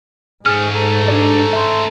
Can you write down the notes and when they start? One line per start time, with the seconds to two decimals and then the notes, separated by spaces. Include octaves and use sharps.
0.46 G#2 A3 C#4 G#4 F6
0.74 A4 A#5
1.08 D4 G4 D5
1.53 E5 C6